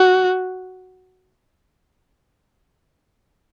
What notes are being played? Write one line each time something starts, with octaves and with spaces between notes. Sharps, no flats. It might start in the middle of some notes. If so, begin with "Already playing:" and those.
Already playing: F#4